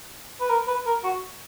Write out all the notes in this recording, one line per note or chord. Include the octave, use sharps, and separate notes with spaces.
B4
A#4
B4
A#4
F#4